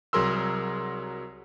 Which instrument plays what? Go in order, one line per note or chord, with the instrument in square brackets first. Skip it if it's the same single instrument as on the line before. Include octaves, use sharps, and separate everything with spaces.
[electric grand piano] C2 F#3 G#4 A#4 C6 E6